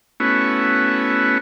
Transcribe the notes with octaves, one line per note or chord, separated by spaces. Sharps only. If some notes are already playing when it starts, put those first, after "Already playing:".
A3 B3 C#4 E4 F#4